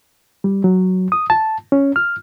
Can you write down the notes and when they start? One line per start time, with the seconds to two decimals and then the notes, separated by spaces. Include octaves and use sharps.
0.44 G3
0.64 F#3
1.12 D#6
1.30 A5
1.72 C#4
1.96 F6